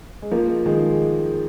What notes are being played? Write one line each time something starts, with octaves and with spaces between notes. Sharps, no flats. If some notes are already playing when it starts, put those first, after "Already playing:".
G#3
F3 A#3
D#3 G#3